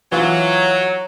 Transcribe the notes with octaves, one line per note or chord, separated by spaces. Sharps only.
E3 F#3 F4